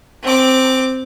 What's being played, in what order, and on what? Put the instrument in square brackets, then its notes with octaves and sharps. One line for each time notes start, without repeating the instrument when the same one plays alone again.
[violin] C4 D6